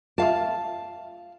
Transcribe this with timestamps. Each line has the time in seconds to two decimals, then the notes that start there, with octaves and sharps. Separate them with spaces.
0.18 F4 E5 F5 A5